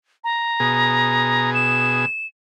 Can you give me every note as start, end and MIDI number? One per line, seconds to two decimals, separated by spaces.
0.24 1.52 82
0.60 2.05 47
0.60 2.05 68
1.54 2.27 100